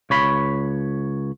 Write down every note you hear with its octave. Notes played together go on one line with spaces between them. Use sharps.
C#2 C#5 B5